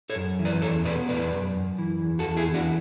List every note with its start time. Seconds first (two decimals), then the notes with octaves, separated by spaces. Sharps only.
0.10 A4 C#5
0.15 F#2
0.39 E3
0.45 B4 D5
0.62 E2 A4 C#5
0.85 B2 B4 D5
1.09 E2 B4 D5
1.32 F#2
1.55 F#2
1.78 E3
2.02 E2
2.19 F#4 A4
2.25 E2
2.36 E4 G#4
2.49 E3
2.54 D4 F#4